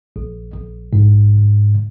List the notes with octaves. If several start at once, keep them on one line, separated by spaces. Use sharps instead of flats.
A#1
A#1
G#2